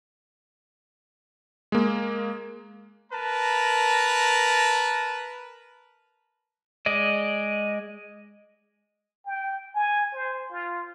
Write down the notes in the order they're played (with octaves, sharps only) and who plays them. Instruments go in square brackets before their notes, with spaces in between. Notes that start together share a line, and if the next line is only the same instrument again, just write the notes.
[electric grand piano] G#3 A#3
[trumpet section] A#4 B4 A5 A#5
[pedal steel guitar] G#3 D5 D#5
[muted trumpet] G5
G#5
C5
F4